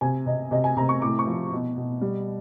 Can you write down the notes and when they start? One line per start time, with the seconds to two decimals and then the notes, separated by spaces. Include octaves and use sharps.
0.01 C3 G#5
0.26 C3 D#5
0.51 C3 D#5
0.64 G#5
0.77 C3 A#5
0.89 C#6
1.02 A2 D6
1.19 C#6
1.27 F3
1.52 B2
1.77 B2
2.01 G3